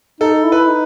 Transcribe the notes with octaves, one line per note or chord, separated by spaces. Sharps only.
D#4 A4
E4
B4
D#4